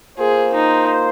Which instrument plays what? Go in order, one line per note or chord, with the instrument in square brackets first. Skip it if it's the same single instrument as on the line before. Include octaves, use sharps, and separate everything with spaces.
[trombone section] A#3 F4 C5 [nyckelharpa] G#4
[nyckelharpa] D#4